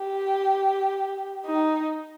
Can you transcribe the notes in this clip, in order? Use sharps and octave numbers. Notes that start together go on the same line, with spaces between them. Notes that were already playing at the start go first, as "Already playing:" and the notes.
Already playing: G4
D#4